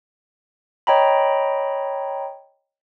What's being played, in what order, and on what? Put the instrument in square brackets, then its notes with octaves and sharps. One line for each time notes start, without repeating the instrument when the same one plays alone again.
[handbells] C#5 D#5 G5 A#5 B5